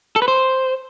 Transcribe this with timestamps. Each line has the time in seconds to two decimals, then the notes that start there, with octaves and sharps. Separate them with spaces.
0.16 A4
0.22 B4
0.28 C5